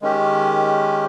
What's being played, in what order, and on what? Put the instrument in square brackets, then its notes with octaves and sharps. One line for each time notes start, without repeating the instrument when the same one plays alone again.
[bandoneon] D#3 G#3 C#4 G4